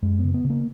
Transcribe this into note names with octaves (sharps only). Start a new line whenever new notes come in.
F#2 G#3
C#3 B3
B3
C#3
A#3